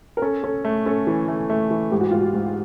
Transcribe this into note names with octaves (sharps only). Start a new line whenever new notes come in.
A#4
C#4 A4
C#4 A4
A3
C#4 A4
E3
A3
A3
E3
G#2 G4
F#4
G#2 F4
F#4
G#2